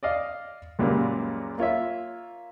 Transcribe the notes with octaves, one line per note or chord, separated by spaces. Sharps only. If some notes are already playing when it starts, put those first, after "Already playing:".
D5 D#5 F5
C#2 F#2 A#2 C#3 G3 A#3
A#3 F4 C#5 E5